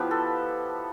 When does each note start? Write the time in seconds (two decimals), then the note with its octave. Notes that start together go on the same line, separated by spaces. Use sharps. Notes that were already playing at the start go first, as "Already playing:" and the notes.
Already playing: F3 B3 E4 G4 B4
0.11 A4